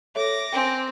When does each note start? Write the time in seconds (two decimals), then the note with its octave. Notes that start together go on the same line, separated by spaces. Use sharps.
0.15 A4 C#5 E5 D6 A#6
0.53 C4 G5 G#5